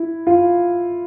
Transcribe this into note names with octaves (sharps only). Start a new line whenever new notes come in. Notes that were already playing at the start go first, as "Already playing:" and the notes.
Already playing: E4
F4